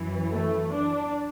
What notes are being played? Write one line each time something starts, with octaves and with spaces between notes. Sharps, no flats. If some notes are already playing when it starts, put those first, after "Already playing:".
Already playing: F#2 E3
A3
D4